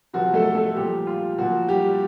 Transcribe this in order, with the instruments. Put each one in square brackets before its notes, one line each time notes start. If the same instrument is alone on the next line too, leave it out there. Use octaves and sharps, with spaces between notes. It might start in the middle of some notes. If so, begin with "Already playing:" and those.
[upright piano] C3 F3 F#4
A3 A4
A3 A4
A#2 F3 G3 G4
F4
A#2 F3 F#4
G3 G4